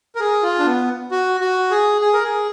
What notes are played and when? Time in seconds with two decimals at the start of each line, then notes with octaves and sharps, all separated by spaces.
0.15 A#4
0.20 G#4
0.43 F4
0.59 D4
0.66 B3
1.11 F#4
1.41 F#4
1.71 G#4
2.01 G#4
2.14 A#4
2.24 G#4